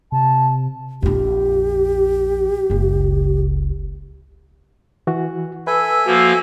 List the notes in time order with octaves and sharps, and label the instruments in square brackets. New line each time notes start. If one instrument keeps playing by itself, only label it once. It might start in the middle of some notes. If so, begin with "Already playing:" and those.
[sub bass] C3 [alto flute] A5
[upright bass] A#1 F2 [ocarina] G4
[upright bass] F#1 C#2
[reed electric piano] E3 F#4
[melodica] A4 E5 G#5 [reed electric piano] B4
[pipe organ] F3 A#3 [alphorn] F#4